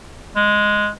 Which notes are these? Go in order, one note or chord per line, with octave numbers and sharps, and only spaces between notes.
G#3